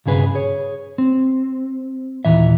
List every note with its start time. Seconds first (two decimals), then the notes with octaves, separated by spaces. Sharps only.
0.06 B1 G2 C#3 G#4 B4
0.35 G#4 C#5
0.98 C4
2.25 D#2 A#2 E3 E5